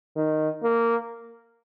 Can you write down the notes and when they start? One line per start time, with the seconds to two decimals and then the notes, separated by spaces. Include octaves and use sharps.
0.16 D#3
0.63 A#3